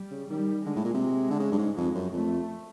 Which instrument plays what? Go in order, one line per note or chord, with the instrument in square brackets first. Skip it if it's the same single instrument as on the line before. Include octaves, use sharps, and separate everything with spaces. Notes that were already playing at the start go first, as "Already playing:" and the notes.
Already playing: [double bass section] G3
[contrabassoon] C#3
[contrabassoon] D#3 [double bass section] G3
[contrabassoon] D3 [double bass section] G#3
[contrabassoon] A2
A#2
C3
[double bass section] G#3
[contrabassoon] D3
C#3
G2
G#2
[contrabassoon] F2 [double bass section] G#3
[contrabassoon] F#2
[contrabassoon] F2 [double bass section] A3